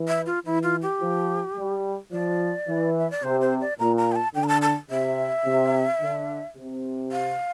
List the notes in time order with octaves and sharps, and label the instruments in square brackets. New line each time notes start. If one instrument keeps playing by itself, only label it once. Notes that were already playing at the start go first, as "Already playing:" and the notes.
Already playing: [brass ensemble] E3
[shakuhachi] E5
F4
[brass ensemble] E3 [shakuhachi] E4
[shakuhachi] F4
G4
[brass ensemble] F3
G3
[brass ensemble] F3 [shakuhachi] D5
[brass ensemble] E3
[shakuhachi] E5
D5
[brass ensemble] C3 [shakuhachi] C5
[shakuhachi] C5
D5
[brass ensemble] A#2 [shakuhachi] A#5
[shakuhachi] A#5
G5
A5
[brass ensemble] D3 [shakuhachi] G5
[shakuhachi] A#5
A5
A5
[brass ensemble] C3 [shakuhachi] E5
[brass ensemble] C3
D3
C3
[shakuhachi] F5